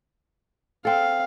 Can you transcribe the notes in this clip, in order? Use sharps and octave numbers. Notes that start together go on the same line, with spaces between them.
C4 A4 F5